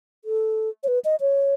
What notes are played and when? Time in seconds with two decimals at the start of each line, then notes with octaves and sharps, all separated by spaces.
0.25 A4
0.83 C#5
0.88 B4
1.05 D#5
1.21 C#5